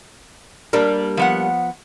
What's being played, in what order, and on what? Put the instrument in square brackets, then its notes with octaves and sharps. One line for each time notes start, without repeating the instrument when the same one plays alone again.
[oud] G3 A#3 D4
[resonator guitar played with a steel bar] F3 B3 F#5